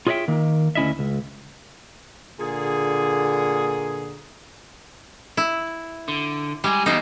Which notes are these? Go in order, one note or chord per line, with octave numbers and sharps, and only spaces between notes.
F4 G#4 C#5 D5 E5 G5
D#3 A#3
D2 C#4 E4 D#5 E5
C#2
A#2 D3 G#4
E4
D3
G3 G#3 G#4
E2 B2 D#4 C5